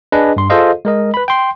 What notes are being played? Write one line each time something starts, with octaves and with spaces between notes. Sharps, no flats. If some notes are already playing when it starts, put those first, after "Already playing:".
D4 G#4 B4 D#5
G2 C6
F4 G#4 A4 C5 D#5 F5
G#3 A#4 D#5
B4 B5
G5 C6